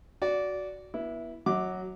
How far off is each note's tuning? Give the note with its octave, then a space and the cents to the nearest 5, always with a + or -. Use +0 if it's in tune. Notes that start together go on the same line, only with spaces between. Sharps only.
F#4 +0 D5 -15
B3 -35 E4 +0
F#3 +0 D#5 +45 D6 +0